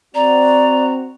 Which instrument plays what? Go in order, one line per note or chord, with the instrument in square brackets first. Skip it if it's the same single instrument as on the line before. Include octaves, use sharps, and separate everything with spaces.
[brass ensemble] C4 F#4 [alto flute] D5 [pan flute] A#5